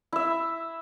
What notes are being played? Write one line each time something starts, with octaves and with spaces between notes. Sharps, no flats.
E4 E5